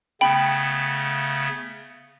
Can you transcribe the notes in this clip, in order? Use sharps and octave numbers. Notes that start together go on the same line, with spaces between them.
C#3 A3 B3 G5 B5